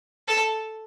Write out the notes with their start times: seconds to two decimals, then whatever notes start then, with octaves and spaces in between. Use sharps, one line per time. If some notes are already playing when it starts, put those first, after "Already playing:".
0.28 A4